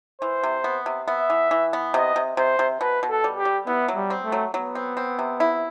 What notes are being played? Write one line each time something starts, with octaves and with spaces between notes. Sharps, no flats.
E3 C5
C3
B3
C3
B3 E5
E3
E3
B3
C3 D#5
C3
C3 C5
C3
B2 B4
B2
A4
G3
G4
G3
B3 E4
F#3
G3
C4
A3
F#3
F#3 B3
C4
C4
C3
E4